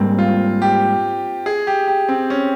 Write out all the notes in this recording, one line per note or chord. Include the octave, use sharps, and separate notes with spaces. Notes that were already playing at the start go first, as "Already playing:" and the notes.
Already playing: G#2 G3 A#3 C4
F4
G4
G#4
G4
G4
C4
C#4